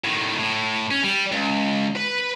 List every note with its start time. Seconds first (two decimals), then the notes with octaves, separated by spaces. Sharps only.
0.04 A2 D#3
0.39 A2
0.91 C#4
1.03 G3
1.32 C#2
1.96 B4 B5